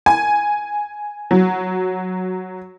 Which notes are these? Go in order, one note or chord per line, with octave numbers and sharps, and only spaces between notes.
G#5
F#3